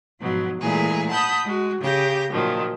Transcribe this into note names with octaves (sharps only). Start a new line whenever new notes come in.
G#2 B2 F3 F#3
A#2 E3 G#3 A3 G#4 A#4
F#5 A5 B5 D#6 G6
G#3 F#4
C#3 G4 G6 A#6
A#2 D#3 F3 F#3